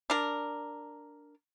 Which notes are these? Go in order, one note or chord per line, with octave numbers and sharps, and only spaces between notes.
D4 A#4